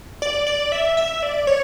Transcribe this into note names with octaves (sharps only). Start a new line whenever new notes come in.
D5
D5
E5
E5
D5
C#5